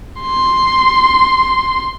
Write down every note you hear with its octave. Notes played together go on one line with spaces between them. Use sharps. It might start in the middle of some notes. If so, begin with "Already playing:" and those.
C6